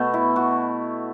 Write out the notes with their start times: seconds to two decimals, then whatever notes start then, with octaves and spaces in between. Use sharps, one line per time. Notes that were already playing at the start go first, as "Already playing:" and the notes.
Already playing: B2 A3 F#4
0.14 E4
0.36 F#4